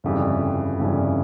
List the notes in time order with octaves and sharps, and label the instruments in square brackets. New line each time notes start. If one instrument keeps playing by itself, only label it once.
[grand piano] G1 F2 C#3 E3 G3
G1 F2 C#3 E3 G3